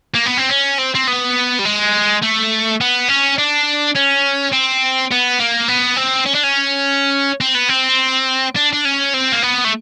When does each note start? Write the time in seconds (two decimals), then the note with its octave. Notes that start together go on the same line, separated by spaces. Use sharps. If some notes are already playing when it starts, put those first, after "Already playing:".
0.15 A#3
0.26 B3
0.38 C4
0.50 C#4
0.79 C4
0.95 C4
1.08 B3
1.59 G3
1.65 G#3
2.22 A3
2.81 B3
3.09 C#4
3.38 D4
3.96 C#4
4.53 C4
5.11 B3
5.39 A#3
5.68 B3
5.97 C4
6.26 C#4
6.35 D4
6.44 C#4
7.41 C4
7.55 B3
7.69 C4
8.56 D4
8.73 D4
8.85 C#4
9.14 C4
9.32 A#3
9.42 B3
9.64 A3